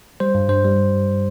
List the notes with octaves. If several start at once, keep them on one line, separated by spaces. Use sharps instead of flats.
G3 C5
G2
G2 C5
G3